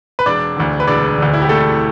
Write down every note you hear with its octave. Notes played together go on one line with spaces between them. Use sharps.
B4
E1 D4 D5
D2 D3
B4
E1 D4 D5
D2 D3
E4
G4
E1 A3 A4